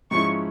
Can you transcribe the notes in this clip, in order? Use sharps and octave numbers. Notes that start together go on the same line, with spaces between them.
G#2 F3 G#3 C#4 E4 C#6